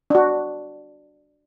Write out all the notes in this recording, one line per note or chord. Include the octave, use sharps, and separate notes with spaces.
D4 F#4